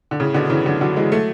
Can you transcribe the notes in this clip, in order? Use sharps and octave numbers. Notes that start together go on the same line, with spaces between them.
D3
A2 C#3
B2 D3
C#3 E3
D3 F#3
D3 F#3
E3 G#3
F#3 A3